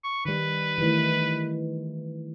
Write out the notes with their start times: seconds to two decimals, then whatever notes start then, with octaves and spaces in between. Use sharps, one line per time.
0.04 C#6
0.25 D#3 G3 B4
0.78 D#3 E3 A3